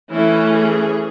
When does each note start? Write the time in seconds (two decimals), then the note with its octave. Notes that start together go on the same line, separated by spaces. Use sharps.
0.10 E3 A3 C#4 E4
0.52 G#4